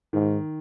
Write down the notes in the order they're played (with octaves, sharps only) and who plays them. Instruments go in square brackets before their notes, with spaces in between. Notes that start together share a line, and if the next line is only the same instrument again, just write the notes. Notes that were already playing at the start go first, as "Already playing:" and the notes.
[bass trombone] G#2 [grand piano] D#3